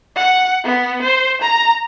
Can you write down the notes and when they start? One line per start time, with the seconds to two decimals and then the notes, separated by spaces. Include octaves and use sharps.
0.16 F#5
0.64 B3
1.02 C5
1.41 A#5